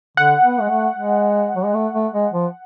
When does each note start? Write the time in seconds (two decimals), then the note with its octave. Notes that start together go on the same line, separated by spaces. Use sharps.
0.17 D3 F#5
0.44 B3
0.60 G#3
0.70 A3
0.96 G#3
1.56 F#3
1.65 G#3
1.74 A3
1.94 A3
2.13 G#3
2.33 F3